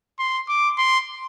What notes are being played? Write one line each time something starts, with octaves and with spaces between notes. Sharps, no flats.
C6
D6
C6